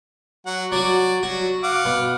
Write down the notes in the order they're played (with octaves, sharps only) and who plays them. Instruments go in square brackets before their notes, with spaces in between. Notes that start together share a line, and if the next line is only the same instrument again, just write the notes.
[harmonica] F#3 F#5
[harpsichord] F#3 F#4 [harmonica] D5
[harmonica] F#3 [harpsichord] F#4
[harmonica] F5 F#5 D6
[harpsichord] B2